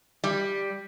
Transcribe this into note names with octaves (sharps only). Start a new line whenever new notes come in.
G3